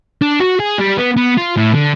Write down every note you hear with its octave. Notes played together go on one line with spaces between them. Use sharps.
D4
F#4
G#4
G3
B3
B3
F4
A2
D3